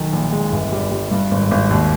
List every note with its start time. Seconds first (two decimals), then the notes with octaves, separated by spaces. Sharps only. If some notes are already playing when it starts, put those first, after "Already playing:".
Already playing: B1 D#3
0.13 A#1
0.32 G#3
0.52 G1
0.72 G3
0.91 G3
1.11 G2
1.31 G#1
1.51 G#1
1.71 D#2